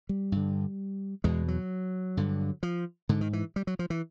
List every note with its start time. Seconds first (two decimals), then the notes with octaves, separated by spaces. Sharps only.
0.09 G3
0.32 G2 D3
1.24 E2 B2 G#3
1.48 F#3
2.17 G2 D3
2.63 F3
3.09 G#2 D3
3.21 D#3
3.33 E3
3.56 G3
3.67 F#3
3.79 F3
3.90 E3